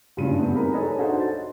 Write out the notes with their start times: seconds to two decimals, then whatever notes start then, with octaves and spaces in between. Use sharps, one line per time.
0.17 F#1 G2 C#3 E4 F4 D#7
0.38 B3 C4
0.54 D#4 A#4 B5
0.73 D#4 G#4 A4 B4 C#5 D#5
0.97 D4 D#4 F#4 A4 C5 D#5
1.20 A6